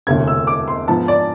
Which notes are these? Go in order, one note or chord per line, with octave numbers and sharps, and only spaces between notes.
E1 D2 C3 G#6
E6
D6
C6
G#2 F3 B3 A5
D5